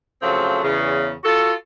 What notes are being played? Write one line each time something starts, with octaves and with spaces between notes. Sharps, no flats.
C#3 F3 F#3 A3 C4
E2 C#3
F4 F#4 A4